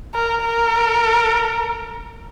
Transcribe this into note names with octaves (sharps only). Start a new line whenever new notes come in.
A#4
A#4